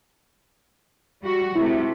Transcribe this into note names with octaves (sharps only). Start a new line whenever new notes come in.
G3 F#4
C3 A3 E4